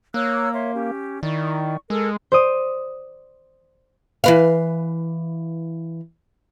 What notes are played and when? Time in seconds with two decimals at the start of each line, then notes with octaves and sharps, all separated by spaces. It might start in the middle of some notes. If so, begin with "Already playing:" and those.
0.14 A#3 C#5 E6 F#6
0.54 C#5 E5 C6
0.74 C#4 G4
1.23 D#3 E4 D5 C#6
1.90 G#3 A4 A#4 E6
2.32 C5 D5 D#6
4.24 E3 B4 F5